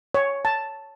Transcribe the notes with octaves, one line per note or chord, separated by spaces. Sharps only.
C#5
A5